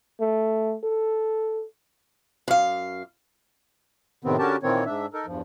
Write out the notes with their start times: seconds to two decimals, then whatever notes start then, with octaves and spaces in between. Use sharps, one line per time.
0.21 A3
0.84 A4
2.48 F#2 F5
4.24 A2 C3 D#3 B3 C4
4.39 D3 C#4 F#4 G4 A#4 A5
4.63 A#2 D#3 E3 A#3 C4 C#5
4.86 G#2 D4 E5
5.14 D#4 A4 A#4
5.26 E2 G2 F3